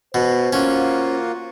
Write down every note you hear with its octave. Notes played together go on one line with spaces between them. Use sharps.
B2 C5
A#3 C#4 F4 F#4